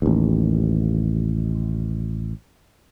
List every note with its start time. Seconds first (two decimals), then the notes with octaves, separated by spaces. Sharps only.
0.02 A1 D#2